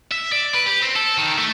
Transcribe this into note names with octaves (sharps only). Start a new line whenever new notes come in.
E5
D5
B4
G4
C4
A4
D#3
A3